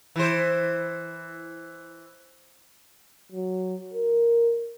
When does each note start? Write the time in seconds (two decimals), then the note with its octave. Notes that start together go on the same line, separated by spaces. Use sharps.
0.16 E3 C5
3.32 F#3
3.94 A#4